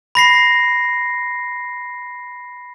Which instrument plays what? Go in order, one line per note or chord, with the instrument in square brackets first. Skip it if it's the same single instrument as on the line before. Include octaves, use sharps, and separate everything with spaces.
[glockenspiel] B5 A#6 C7